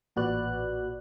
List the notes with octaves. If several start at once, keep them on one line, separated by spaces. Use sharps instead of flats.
A1 A#2 F#4 B4 D5 F#6